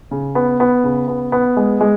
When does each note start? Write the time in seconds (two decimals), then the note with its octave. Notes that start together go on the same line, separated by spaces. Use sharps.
0.11 C#3
0.35 B3
0.60 B3
0.84 C#3
1.08 B3
1.32 B3
1.57 G#3
1.81 G#3